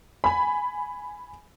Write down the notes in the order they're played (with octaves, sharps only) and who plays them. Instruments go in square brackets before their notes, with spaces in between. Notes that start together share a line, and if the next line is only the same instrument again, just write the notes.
[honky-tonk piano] G#5 B5